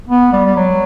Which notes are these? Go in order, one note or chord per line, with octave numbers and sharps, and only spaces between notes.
B3
G3
G3
F#3